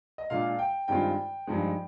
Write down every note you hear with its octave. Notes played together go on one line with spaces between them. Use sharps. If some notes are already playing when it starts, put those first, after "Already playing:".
D#5
A#2 G#3 D4 F4 F5
G5
G2 D#3 G#3 C4 F4 G5
G2 F3 G#3 D#4